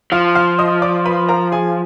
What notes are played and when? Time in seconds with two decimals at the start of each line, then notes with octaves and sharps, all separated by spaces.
0.12 F3 F5 F6
0.35 F5 F6
0.59 D#5 D#6
0.82 D5 D6
1.06 B4 B5
1.28 A#4 A#5
1.52 G#4 G#5